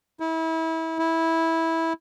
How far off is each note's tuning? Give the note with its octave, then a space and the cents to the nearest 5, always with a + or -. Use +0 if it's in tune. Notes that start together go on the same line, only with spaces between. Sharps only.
E4 -30
E4 -15